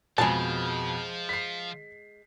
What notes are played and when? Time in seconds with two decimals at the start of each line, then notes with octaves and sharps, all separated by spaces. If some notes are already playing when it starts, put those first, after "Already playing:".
0.18 F2 B2 F3 G#3 A5
1.29 B6 C7